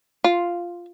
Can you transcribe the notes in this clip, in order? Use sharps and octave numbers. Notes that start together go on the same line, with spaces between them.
F4